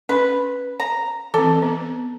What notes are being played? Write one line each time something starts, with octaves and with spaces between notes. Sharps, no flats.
C#4 B4
A#5
E3 C4 A4
B3